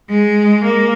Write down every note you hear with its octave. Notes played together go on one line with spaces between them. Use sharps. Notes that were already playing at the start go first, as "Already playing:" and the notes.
G#3
A#3